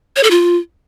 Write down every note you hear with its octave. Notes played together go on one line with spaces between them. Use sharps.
C#5
A4
F4